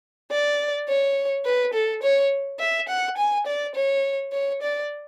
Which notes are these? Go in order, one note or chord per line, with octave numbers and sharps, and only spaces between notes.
D5
C#5
B4
A4
C#5
E5
F#5
G#5
D5
C#5
C#5
D5